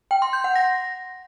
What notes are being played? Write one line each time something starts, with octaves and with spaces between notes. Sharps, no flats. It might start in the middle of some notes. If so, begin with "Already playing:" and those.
G5
C6
G6
F#5
A#6